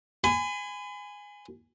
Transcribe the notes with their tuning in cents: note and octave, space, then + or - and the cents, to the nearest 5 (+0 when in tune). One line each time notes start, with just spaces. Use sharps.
G#5 -5 B5 +40